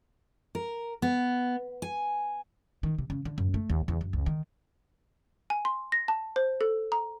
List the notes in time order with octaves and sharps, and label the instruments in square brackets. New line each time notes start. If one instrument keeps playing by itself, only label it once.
[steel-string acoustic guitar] A#4
B3
G#5
[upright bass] D#3
C3
C#3
D3
F#2
A3
D#2
E2
F#2
C#2
D#3
[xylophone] G#5
C6
A#6
A5
C5
A4
A#5